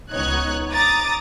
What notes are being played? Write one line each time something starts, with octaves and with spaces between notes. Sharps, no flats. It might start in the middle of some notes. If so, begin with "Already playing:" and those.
C#2 B3 D#4 C#5 F#6 G#6
A#5 D6 D#6 A6